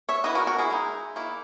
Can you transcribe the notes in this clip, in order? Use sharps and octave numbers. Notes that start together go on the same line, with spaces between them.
C#5 E5
E3 B3 E4 B4 D#5
F#4 A#4
F#4 A#4
E4 G#4
G#3 D#4
D#3 A#3 E4